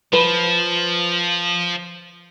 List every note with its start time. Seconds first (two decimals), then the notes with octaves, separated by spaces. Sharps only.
0.13 F3 B4